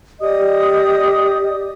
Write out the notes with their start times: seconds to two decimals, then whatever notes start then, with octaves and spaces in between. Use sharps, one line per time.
0.21 G4 D5 D#5 D#6